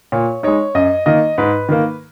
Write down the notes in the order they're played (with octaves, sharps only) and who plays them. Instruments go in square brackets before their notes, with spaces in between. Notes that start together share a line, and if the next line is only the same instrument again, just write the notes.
[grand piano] A#2 C#5
G#3 D#4 C#5
F#2 D#5
D#3 A#3 D#5
G#2 B4
D#3 A#3